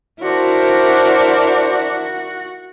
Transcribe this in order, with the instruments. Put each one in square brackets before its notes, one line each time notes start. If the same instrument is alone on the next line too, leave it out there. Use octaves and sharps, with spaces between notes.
[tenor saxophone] D4 [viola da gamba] E4 A#4 [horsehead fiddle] F#4 [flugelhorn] C5